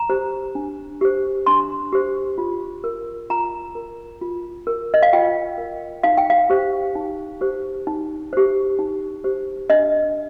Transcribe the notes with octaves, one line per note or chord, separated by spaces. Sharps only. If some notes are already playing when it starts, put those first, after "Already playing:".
Already playing: A#5
G4 C5
D4
G4 C5
D4 C6
G4 C5
F4
A#4
F4 A#5
A#4
F4
A#4
D#5
F5
F4 G5
A#4
D#4 F5
G5
F5
G4 C5
D#4
G4 C5
D#4
G4 C5
D#4
G4 C5
D4 D#5